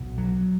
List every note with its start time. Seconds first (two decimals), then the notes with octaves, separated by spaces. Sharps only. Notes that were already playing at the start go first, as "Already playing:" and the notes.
Already playing: B1 B2
0.18 F#3